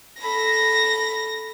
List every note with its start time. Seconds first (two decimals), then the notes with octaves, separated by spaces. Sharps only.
0.21 A4 B5 A#6